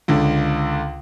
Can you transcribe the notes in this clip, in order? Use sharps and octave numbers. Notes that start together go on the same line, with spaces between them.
C#2 D3